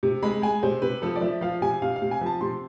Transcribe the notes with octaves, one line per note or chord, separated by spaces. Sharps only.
C3
G#3 B5
G#3 G#5
C3 C5
C3 B4
F3 A4
D5
F3 E5
F3 F5
C3 G#5
C3 F5
F5
C3
G#5
F3 A5
C3 C6